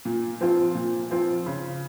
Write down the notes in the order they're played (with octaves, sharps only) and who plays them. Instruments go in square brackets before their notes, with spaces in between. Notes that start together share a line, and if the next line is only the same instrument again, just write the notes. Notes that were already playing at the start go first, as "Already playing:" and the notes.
[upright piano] A#2
F3 C4 F4
A#2
F3 C4 F4
C#3